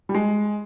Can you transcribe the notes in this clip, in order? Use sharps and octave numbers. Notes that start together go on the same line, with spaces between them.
G3
G#3